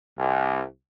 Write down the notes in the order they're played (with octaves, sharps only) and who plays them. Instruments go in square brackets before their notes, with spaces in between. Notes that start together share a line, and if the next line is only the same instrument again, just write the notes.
[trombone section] C2